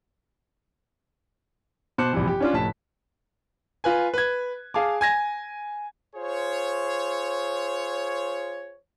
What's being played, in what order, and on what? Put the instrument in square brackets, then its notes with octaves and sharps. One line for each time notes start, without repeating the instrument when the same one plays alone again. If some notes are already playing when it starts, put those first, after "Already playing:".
[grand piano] B2 C5 A5 D6 F#6 C#7
A#1 G2 C3 E3
G4
C#4 D4 F4
F1 A2 A5 B6
F4 B4 G#5
B4 G#6
G#4 F5 G#5 A5 D6
G#5 G#6 A#6
[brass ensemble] F4 G#4 C5 C#5